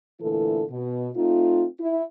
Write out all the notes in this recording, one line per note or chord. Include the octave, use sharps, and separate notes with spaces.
A#2 D3 E3 A3 E4 A4
B2
A3 C4 D#4 F4
E4